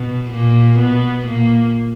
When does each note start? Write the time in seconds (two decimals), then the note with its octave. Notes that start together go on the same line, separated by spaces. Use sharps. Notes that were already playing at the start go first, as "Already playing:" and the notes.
Already playing: B2
0.30 A#2 A#3
0.79 B2 B3
1.27 A#2 A#3